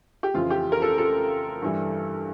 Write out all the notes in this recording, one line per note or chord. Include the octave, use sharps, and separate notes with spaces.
G4
F2 C#3 E3 F4
G4
A#4
A4
A4
G2 E3 G3